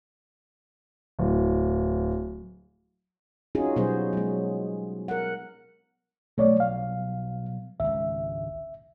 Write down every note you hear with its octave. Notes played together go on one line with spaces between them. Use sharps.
D1
C#4 D#4 F4 F#4 G#4
B2 F#3 G3 B3 G#4 C5
F#3 G#3
A#4 F#5
B2 F#3 G3 A3 C#5 D5
F5
G#1 C#2 E5